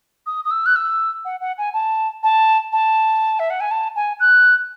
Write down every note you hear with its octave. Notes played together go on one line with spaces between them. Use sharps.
D#6
D#6
E6
F#6
E6
F#5
F#5
G#5
A5
A5
A5
E5
F#5
G#5
A5
G#5
F#6